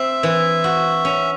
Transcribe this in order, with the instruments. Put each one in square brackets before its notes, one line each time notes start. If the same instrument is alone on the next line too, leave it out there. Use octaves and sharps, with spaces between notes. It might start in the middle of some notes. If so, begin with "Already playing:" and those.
Already playing: [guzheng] C4 [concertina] E5
[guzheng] E3
F#4
C#4